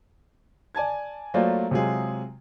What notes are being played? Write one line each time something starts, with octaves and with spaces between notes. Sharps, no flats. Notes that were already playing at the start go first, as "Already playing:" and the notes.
D5 G#5 A5 G#6
F#3 A3 A#3 F4 C5 D5
C3 F#3 G#3 F4 G#4